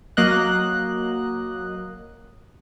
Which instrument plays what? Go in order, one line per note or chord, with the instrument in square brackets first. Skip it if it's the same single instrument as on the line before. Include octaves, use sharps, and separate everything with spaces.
[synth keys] F#3 A#3 D#5 F#6